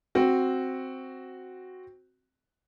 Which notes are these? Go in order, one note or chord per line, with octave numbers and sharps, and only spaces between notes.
C4 F#4